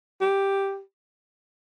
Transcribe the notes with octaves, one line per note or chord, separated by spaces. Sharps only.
G4